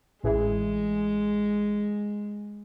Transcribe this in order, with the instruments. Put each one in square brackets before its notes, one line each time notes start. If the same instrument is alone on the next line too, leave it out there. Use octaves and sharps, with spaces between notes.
[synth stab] A1 E3 G#4 [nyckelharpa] G#3